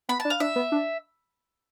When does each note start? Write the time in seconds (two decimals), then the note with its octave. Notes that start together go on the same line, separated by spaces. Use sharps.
0.09 B3 B5
0.20 A5
0.25 D4
0.30 F5
0.40 D4 E5
0.56 B3
0.72 D4